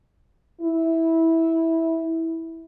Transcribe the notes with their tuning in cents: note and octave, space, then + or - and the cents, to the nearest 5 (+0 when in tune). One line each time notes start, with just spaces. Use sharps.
E4 -15